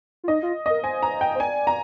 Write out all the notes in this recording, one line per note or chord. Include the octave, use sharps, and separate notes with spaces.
F4
D#4 D#5
F4
A#4 D#5
C5 G#5
A#5
G5
C5
D5 G#5
A#5